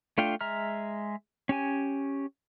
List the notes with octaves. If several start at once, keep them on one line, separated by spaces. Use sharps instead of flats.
A3 D4 F4 F5 G5
G#3 E5 A#5 F6
C#4 G4 G#5